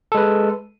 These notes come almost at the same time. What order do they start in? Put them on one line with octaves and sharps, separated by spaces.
A4 G#3 B4